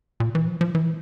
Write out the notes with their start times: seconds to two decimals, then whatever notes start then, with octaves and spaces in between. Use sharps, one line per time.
0.20 A#2
0.35 E3
0.47 F3
0.61 F3
0.75 E3